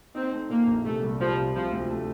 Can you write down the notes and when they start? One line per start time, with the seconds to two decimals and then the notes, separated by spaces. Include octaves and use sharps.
0.15 C4 D#4
0.32 A3
0.50 A#2 A#3
0.67 A#1
0.85 C3 A3
1.03 C2
1.20 F3 G3
1.37 C3
1.54 C3 F3
1.72 D2
1.90 A3